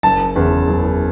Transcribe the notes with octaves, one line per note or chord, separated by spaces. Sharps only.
F#1 A5
E2 C#3
F#1